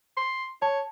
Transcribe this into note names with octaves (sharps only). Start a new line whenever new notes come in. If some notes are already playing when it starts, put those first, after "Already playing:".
C6
C#5 A5